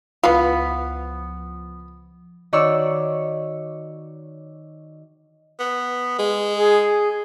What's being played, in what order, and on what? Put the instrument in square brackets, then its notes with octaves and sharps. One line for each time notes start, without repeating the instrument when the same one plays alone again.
[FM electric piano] C#2 F3 [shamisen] E3 B4 F5 [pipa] B3
[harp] D#3 F#4 C#5 D5 C#6 E6
[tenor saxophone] B3
G#3
[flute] G#4